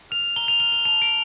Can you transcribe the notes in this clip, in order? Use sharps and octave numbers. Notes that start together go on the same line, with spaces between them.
F6 F7
A#5 G7
F7
F6 G7
G7
A5 F7
D7